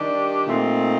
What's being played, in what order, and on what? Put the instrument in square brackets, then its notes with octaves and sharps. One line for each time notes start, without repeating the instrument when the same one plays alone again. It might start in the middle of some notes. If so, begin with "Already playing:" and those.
Already playing: [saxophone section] D#3 G3 D4 G4
A#2 A3 C4 D#4